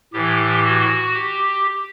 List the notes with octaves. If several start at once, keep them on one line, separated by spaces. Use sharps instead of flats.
A2 E3 G4
F#4
G4